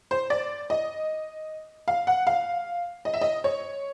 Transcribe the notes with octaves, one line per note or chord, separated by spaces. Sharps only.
C5
D5
D#5
F5
F#5
F5
D#5
E5
D#5
C#5